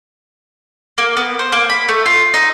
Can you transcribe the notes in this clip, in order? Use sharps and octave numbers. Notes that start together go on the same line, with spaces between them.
A#3
B3
C5
A#3
B5
A3
F4
D#4